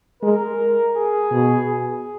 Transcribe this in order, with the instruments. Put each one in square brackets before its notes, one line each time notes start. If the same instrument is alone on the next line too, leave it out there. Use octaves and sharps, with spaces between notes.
[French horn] G#3 [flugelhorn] A#4
[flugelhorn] G#4
[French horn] B2
[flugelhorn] G#4